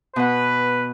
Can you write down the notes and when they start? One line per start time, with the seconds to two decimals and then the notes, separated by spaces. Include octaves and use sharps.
0.16 B2 B4 F#5